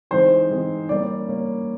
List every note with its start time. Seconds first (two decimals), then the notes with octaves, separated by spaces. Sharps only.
0.11 E3 G#3 C4 D#4 G#4 C5
0.50 E3 G#3 C4 D#4 G#4
0.89 G3 A#3 C#4 D5
1.28 G3 A#3 C#4